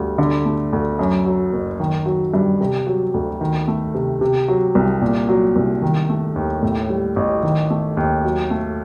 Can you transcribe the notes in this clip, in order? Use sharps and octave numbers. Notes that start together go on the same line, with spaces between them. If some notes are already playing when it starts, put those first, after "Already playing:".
Already playing: D2 G3
D3
A3
D2
F#2
F#3
F#1
D#3
F#3
G2
C3
F#3
D2
D#3
A3
C3
C3
F#3
C2
A#2
F#3
C2
D#3
A3
D#2
A2
G3
A1
D#3
A3
D#2
F#3
A3